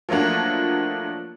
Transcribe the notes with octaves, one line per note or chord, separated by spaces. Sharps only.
F3 F#3 A3 A#3 D4